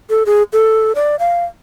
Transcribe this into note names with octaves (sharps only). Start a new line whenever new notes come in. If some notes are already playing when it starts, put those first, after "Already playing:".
A4
G#4
A4
D5
F5